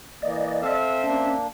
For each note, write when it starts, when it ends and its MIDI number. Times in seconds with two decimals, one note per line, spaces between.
0.22 0.62 52
0.22 0.62 58
0.22 0.77 74
0.22 0.77 75
0.62 1.35 60
0.62 1.04 69
0.62 1.35 76
0.62 1.04 77
1.04 1.47 58
1.04 1.39 61
1.04 1.47 62